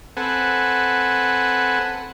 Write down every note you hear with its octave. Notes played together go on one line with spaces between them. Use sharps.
C4 A4 B4 F#5 G#5